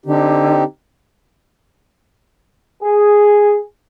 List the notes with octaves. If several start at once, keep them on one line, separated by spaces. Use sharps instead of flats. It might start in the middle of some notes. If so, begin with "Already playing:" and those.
D3 C4 D#4 G4
G#4